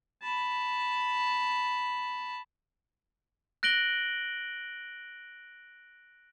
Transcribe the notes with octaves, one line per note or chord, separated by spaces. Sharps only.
A5 B5
F#6 A#6 D7 F#7 G7